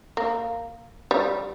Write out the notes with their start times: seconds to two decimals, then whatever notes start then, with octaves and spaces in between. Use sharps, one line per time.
0.17 A#3
1.11 G3